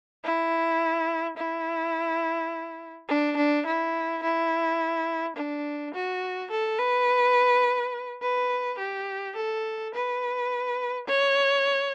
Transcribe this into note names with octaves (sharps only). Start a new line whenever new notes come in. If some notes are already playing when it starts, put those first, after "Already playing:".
E4
E4
D4
D4
E4
E4
D4
F#4
A4
B4
B4
G4
A4
B4
C#5